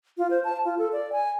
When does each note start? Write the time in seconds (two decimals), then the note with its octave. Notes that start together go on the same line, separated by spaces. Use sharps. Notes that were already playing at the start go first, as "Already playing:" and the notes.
0.18 F4
0.30 C5
0.44 A5
0.65 F4
0.79 A4
0.93 D5
1.12 G#5